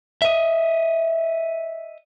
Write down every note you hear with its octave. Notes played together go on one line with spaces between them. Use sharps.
D#5 E5